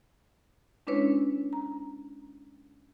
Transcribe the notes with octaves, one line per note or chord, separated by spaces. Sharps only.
G#3 C#4 D4 E4 B4 C#5
A#5